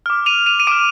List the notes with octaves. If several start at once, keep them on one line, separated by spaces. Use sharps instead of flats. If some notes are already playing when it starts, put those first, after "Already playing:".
D6 F6
D#7 F7
D#7 F7
D#7
D6 F6 D7 E7